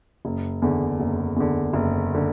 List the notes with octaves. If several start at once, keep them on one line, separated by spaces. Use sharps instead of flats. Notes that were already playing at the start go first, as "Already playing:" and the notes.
F#1
E2 D3
F#1
E2 D3
F#1
D3